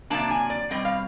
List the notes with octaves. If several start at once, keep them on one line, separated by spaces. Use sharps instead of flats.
C3 D#3 F#3 A#3 D4 A5
G#5
D5
B2 G3 C4 D#5
F5